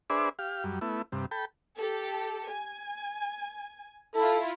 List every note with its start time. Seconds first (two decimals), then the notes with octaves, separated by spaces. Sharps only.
0.10 D4 G#4 B4 C5 D5 E5
0.39 G4 F5
0.64 F#2 G3
0.81 A3 B3 E4
1.12 G2 C3
1.31 A4 G5 B5
1.77 G4 A4
2.48 G#5
4.15 E4 F4 A4